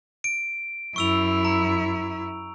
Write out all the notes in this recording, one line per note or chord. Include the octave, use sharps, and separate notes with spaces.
D7
F#2 E4 C#6 E6 F7
A#5